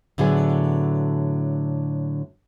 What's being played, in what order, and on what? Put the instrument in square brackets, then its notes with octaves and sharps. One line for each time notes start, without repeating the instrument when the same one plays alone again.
[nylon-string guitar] A2 D3 F#3 B3 G#4